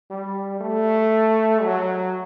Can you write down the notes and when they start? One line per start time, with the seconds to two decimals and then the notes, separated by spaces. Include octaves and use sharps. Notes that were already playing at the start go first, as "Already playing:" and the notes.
0.11 G3
0.61 A3
1.63 F#3